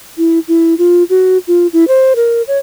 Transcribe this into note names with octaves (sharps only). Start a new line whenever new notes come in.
E4
E4
F4
F#4
F4
E4
C5
A#4
C#5